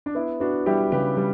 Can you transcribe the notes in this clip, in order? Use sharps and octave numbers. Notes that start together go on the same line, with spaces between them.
D4
B3 E4
B3 D4 F#4
G3 E4 G4
C#3 G4 B4
G3